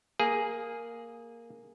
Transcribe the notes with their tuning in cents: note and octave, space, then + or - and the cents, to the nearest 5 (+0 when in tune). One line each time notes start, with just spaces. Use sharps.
A#3 +0 G#4 +0